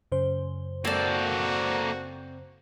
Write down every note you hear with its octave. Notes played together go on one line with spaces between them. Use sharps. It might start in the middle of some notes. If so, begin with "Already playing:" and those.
F#2 C#3 C5
A#3 C4 F#4 A4 D5